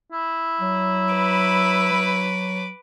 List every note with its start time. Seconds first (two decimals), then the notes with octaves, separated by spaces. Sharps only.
0.13 E4
0.60 F#3
1.13 B4 D6
1.92 F#3